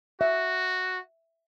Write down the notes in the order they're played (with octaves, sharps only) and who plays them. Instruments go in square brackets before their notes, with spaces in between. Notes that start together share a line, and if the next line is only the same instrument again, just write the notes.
[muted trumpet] F#4 [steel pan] E5